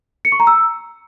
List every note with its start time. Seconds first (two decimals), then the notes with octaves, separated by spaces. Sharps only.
0.25 C#7
0.32 C#6
0.40 A#5
0.47 E6